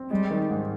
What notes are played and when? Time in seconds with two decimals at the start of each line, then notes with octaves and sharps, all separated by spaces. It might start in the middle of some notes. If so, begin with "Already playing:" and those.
Already playing: C4
0.11 G3 G#3
0.31 D#3
0.51 G#2